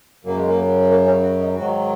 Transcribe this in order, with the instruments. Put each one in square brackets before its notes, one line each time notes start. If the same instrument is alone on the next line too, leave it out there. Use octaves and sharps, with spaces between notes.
[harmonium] F#2 C#3 F#3 A#3
G#3
A#3
A#3
C#4
F#4
D#4
G#2 D#3 F#3 F#4